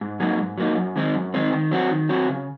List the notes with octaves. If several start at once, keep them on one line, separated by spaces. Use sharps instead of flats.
G#2
F#3 A#3 D#4
G#2
F#3 A#3 D#4
F#2
D#3 G#3 C4 D#4
F#2
D#3 G#3 C4 D#4
D#3
F#3 C4 F#4
D#3
F#3 C4 F#4
C#3